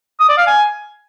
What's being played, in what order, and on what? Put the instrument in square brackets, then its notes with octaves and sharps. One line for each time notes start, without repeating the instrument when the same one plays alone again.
[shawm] D#6
D5
F5
G#5